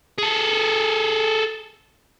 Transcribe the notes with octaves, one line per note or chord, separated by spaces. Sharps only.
G#4 A4